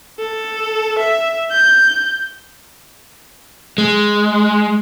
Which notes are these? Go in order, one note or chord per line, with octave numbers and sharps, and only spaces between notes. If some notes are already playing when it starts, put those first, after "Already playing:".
A4
E5
G6
G#3